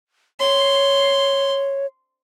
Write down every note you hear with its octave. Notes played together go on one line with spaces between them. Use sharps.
C#5 C6